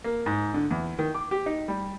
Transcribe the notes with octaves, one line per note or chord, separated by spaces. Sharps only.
A#3
G#2
D3
E2
D#3
D6
G4
D#4
G3